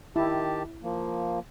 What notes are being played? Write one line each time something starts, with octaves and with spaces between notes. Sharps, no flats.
D#3 E4 G4 A5
F3 A#3